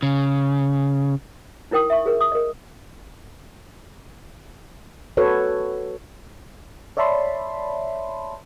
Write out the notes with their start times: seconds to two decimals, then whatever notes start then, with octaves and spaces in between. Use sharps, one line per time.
0.03 C#3
1.71 D#4 E4 A#4 G5 D#6
1.90 E5 C#6
2.06 G#4 A#4
2.21 D#6
2.32 A#4 D#5
5.17 F#4 A4 B4 C#5
6.97 C#5 D5 E5 A5 B5 C6